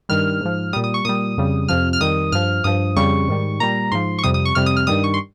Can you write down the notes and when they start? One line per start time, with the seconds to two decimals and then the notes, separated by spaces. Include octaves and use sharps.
0.09 G2 D#3 G3 F6
0.41 G#2 F3
0.73 A#2 G3 D#6
0.84 D#6
0.94 C#6
1.05 A#2 G3 D#6
1.37 F2 C#3 G3
1.68 F2 C3 F3 F6
1.93 F6
2.01 F2 D#3 G3 D#6
2.32 G2 F3 F6
2.64 G2 F3 D#6
2.96 F2 C#3 G3 C#6
3.28 G#2 D#3 G3
3.60 A#2 G3 A#5
3.92 G#2 F3 C6
4.19 C#6
4.23 F2 C3 G3 D#6
4.34 D#6
4.45 C#6
4.55 F2 C3 G3 F6
4.66 D#6
4.77 F6
4.87 G2 D#3 G3 D#6
5.04 C#6
5.14 C6